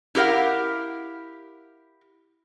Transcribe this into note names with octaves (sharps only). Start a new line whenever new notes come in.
E4 G4 A#4 F5 F#5